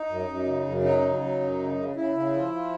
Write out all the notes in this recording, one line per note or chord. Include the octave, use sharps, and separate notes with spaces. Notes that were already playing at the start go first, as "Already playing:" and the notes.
Already playing: D#4
F#2
F#2
C#3
F#2
F#3 D#4
C#3
F#3
F#2
C#3
C#3
C#3 E4
C#3
F3
F3